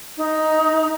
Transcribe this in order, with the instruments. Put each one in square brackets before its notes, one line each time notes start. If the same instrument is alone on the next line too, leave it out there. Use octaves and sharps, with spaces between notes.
[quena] D#4